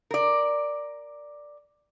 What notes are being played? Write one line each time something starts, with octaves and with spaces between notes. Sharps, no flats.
A#4 D5